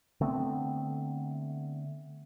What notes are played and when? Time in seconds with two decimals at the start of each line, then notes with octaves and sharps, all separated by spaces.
0.21 D3 A3 B3 C4